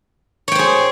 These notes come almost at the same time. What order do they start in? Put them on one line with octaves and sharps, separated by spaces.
C#5 G5 C5 G#4